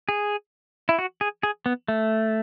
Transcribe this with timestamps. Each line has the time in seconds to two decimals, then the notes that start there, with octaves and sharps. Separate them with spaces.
0.09 G#4
0.89 E4
0.99 F#4
1.21 G#4
1.43 G#4
1.66 B3
1.88 A3